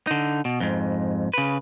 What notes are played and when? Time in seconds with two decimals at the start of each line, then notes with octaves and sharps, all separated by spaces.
0.07 D3 D#4
0.45 B2
0.60 F2 G#2
1.34 C#3 B4